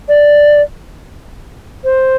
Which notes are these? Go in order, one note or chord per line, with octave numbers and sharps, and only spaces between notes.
D5
C5